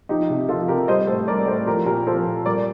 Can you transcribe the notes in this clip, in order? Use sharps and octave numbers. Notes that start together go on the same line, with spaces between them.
F3 D#4 G4
C3
F3 F4 A4
C3 G4 A#4
G3 C5 D#5
A2 A4 C5
G3 A#4 D5
A2 A4 C5
F3 G4 A#4
A#2 G4 A#4
F3 A4 C5
A#2
G3 A#4 D5